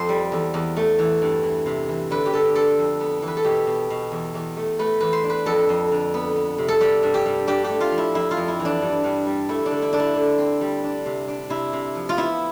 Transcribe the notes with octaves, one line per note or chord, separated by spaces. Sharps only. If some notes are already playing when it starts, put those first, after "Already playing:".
Already playing: F2 A4 C5
G3
E2
E2
A3
E3
G2
E3
C3
E3
D3 B4
G4
D3 A4
C4 A4
F2
B3
E3
B4
A4
B2 G4
B2
B2
E2
E2
A3
A3 B4
E2 B4
C5
D4
B4
F2 A4
F2
D3
B3
B3
C3
A4
G3 G4
G2
G4
G2
D4 G4
G4
A3
F4
F3
E4
F2 E4
F4
F2
E4
E3
D4
G2
G2
G3
A3 E4
D4
D3
E4
D3 D4
E4
D3
C4
G3
D4
C3
D4
C3 E4
C3
F3
F4
B3 E4